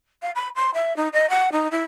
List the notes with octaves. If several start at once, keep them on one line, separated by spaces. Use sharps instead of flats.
F5
B5
C6
E5
D#4
D#5
F#5
D#4
E4